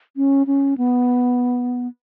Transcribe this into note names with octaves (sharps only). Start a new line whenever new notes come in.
C#4
C#4
B3